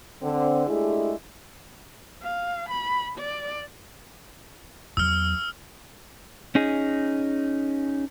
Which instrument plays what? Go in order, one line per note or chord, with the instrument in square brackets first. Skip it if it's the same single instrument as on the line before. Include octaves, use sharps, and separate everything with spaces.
[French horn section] D3 C4
G#3 A3 D4 E4 G4 G#4
[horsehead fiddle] F5
B5
D5
[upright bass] E2 F#3 [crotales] E6 F6
[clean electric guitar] C#4 D#4 G#4